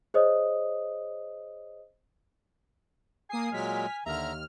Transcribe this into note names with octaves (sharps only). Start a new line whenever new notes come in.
G#4 C5 C#5 D#5 D#6
A#3 G#5 D#6 C7
A#2 F#3 G#3 F6 B6
D#2 D3 E5 A#5 F6